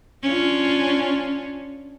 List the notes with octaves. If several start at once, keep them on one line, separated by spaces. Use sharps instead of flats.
C#4 D4 F4